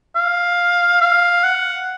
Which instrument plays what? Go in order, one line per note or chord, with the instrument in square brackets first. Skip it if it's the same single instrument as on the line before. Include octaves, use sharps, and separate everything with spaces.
[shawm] F5
F5
F#5